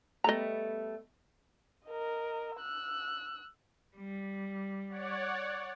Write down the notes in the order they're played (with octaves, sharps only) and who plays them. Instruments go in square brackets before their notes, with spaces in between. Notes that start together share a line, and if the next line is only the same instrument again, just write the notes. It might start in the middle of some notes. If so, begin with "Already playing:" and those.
[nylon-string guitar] G3 A3 B3 [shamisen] D#5 A#5
[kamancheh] A#4 D#5
E6 F#6
[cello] G3
[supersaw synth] C#5 D5 F#5